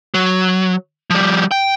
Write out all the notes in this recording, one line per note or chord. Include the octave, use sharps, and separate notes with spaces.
F#3
F3 G3
G5